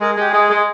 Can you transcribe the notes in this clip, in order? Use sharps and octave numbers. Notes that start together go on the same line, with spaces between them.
G#3 A#4
G#4
G#3 G4
G#4
G#3
G#3